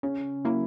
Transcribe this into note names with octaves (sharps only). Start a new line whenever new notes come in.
C#3 C#4
F#3 A#3 E4